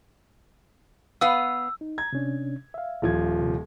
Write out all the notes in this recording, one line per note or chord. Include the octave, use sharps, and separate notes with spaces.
B3 B4 F5 E6
D#4
A#5 G#6
C3 C#4 D4
E5 F5
D#1 F3 G#6
C3